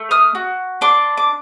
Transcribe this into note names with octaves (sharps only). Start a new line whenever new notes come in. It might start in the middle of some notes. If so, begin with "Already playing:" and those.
Already playing: A3
D#6 F6
F#4
D4 C6 D6
D6